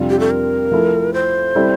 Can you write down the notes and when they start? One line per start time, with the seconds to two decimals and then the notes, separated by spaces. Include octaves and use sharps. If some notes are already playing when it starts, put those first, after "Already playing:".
Already playing: F2 C3 G3 D4 F4
0.10 G4
0.20 A4
0.31 A#4
0.71 F3 A3 E4 A4
1.14 C5
1.55 G3 C4 E4 A4